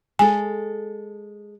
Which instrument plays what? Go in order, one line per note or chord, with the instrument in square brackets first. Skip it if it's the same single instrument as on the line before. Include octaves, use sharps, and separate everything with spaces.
[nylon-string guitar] G#3 A4 [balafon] G#5